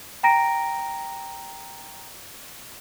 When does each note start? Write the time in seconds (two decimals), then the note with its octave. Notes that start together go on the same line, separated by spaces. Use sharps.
0.23 G5 A#5 A#6 D7